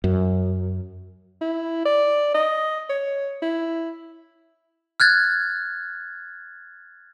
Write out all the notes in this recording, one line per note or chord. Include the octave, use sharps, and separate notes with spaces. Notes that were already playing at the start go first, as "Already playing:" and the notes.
F#2
E4
D5
D#5
C#5
E4
F6 F#6 G#6 A6